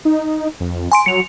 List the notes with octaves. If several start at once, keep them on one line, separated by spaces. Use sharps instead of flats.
D#4
F2
G#5 C6 D7
F#3 C#7 F7